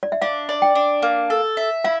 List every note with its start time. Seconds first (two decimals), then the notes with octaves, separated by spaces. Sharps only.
0.03 D5
0.12 E5
0.22 D4 F5
0.49 D5
0.62 G5
0.75 D4
1.02 A#3
1.30 A4
1.57 E5
1.84 E4 F5